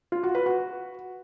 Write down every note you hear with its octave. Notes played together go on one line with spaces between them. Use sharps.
F4
F#4
B4
F#4